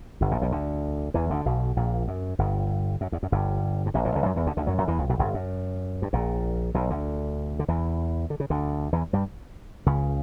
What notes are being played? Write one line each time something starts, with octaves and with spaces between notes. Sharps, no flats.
G1 G2
A#1 A#2
B1 B2
D2 D3
E2 E3
D2 D3
B1 B2
A#1 A#2
F#2
G1 G2
F#2
E2
F#2
G1 G2
G2
A#1 A#2
A#1 A#2
C#2 C#3
F#2 F#3
E2 E3
D2 D3
D2 D3
F#2 F#3
F#2 F#3
E2 E3
C#2 C#3
B1 B2
G1 G2
F#2
G2
A#1 A#2
B1 B2
D2 D3
D3
E2 E3
D3
C#3
D2 D3
E2 E3
G2 G3
C#2 C#3